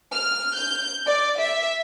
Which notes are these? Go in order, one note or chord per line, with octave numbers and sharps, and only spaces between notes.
F6
G6
D5
E5